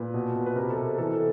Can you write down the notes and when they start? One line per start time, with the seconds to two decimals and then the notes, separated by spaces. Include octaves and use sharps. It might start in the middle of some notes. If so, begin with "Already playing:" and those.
Already playing: A#2 B4
0.14 B2
0.36 B2
0.46 B4
0.56 C3 A#4
0.70 A4
0.78 C3
0.84 A#4
0.98 E3 A4